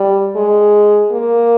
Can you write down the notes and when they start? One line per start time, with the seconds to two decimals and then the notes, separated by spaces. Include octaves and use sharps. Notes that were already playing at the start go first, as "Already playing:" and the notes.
Already playing: G3
0.36 G#3
1.12 A#3